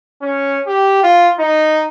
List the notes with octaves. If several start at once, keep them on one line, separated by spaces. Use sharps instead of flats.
C#4
G4
F4
D#4